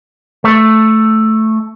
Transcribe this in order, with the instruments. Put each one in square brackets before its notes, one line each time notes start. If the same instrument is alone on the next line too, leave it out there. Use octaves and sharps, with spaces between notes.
[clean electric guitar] A3